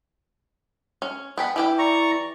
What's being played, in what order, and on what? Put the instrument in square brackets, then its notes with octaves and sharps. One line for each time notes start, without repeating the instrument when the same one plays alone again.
[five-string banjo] C#4
[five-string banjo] B3 G5 B5 [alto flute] G#5
[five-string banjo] E3 G4 G5 [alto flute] E4
[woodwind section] D5 [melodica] A#5 C#6